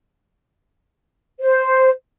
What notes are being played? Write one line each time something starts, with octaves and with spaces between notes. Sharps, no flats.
C5